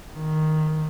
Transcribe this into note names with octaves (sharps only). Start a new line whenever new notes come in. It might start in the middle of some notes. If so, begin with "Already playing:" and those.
D#3